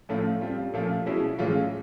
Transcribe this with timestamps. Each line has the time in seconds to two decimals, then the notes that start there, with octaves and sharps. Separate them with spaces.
0.09 A2 F3 A3 C#4 F4
0.41 G3 C4 F4
0.74 A#2 F3 A3 C#4 F4
1.06 B2 G#3 C#4 E4 G#4
1.39 A2 E3 G#3 C#4 F4